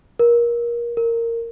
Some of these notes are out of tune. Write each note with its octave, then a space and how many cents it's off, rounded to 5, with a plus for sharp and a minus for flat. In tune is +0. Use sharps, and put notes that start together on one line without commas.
A#4 +25
A#4 -15